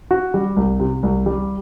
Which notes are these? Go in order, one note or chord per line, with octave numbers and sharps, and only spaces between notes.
F#4
G3
C2
C3
C2
G3